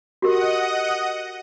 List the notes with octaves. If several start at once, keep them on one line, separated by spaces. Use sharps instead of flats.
F#4 G4 A#4 D#5 F#5 D#6